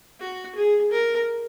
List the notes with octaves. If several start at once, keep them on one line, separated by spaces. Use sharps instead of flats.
F#4
G#4
A#4